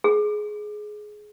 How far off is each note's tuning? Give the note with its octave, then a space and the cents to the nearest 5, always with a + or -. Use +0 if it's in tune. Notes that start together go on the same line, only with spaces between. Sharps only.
G#4 +15